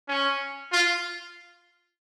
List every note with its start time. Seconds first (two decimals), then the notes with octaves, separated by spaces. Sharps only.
0.08 C#4
0.72 F4